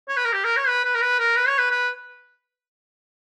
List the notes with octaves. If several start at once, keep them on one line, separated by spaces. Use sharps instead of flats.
C#5
B4
A#4
G4
A#4
C#5
B4
B4
A#4
B4
A#4
B4
C#5
B4
B4